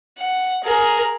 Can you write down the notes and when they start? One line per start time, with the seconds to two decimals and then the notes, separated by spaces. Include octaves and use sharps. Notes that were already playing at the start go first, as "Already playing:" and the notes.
0.18 F#5
0.64 G#4 A#4